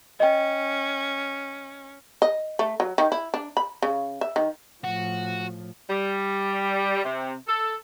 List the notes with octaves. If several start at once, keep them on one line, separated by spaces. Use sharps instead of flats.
C#4 D#5 G5
D#5
A3
F#3
D#3
E4
D4
B5
C#3
E5
D#3
A2 F3 F#4
G3
C3
A4